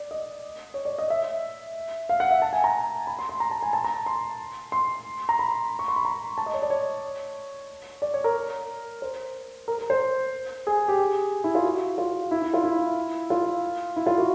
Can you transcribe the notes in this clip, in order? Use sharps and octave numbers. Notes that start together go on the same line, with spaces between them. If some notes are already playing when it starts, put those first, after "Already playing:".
Already playing: D5
D#5
C#5
D5
D#5
E5
F5
F#5
E5
A5
G#5
A#5
B5
C6
C6
A#5
A5
G#5
A5
A#5
C6
C6
A#5
B5
C#6
C6
B5
A#5
A5
D#5
C#5
D5
C#5
D5
C#5
A#4
C5
A#4
A#4
C5
G#4
G4
G#4
E4
F4
F#4
F4
E4
E4
F4
E4
F4
E4
F4
F#4